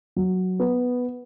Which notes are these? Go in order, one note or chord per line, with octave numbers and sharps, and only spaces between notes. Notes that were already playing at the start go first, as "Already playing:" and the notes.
F#3
B3